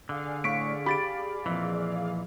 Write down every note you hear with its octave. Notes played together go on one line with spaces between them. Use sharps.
D3 G#4 D5 F5
A2 C#6 B6 D7
G4 B5 A6 D7
F2 A#2 E3